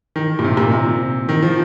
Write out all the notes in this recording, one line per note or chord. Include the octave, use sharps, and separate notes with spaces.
D#3
A#2
C3
A#2
C3
D#3
F3